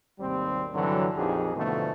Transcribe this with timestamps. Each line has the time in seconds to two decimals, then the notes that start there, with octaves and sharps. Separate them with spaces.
0.20 G#1 D#2 C3 G3 C4
0.75 G2 D3 E3 F#3
1.16 A#1 F2 D#4 G4 G#4
1.54 G#2 B2 D3 E3 F3 A3